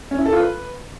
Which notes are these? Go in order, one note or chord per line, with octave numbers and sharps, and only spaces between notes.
C#4
E4
A4
F4
B4